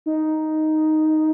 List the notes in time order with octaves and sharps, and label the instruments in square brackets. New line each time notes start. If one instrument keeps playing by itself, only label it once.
[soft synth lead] D#4